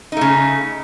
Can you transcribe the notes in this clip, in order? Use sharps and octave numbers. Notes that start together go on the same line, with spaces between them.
C#3 A3 D#4